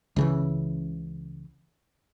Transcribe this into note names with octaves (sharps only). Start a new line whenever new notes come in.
C#2 C#3 E3